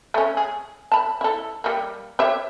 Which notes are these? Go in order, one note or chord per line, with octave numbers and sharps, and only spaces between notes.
A3 C#4
G#4
A5 B5
E4 A4
G3 A#3
G4 C#5 E5